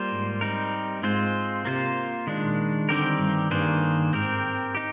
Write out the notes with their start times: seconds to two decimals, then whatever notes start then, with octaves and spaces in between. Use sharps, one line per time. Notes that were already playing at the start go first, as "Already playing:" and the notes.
Already playing: G3 A#3 F4 C5
0.10 G#2
0.41 G3 C4 D#4 A#4
1.02 G#2 G#3 C4 F4 C5
1.65 C3 A#3 F4 C5
2.27 A#2 D#3 G#3 D4
2.89 D3 D#3 G3 C4 G4 A#4
3.20 G2
3.51 G2 D#3 A#3 D4 G#4 C5
4.13 G#2 C4 G4 A#4
4.75 D#4 G4